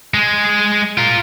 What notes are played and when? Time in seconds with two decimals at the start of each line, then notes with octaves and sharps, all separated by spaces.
0.14 G#3
0.98 F4 A#4